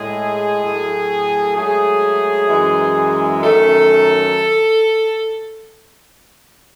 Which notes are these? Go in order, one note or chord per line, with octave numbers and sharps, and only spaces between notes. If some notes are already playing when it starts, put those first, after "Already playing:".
Already playing: A2 G#3 G#4
A2 F#3 A3
G#2 F#3 A3 G#4
F#2 E3 G#3
F#2 D#3 A3 A4